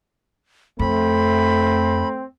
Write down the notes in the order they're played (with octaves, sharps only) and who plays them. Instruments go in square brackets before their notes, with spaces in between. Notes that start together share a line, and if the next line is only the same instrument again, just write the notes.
[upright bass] F2 [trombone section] A3 [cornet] C4 [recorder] B5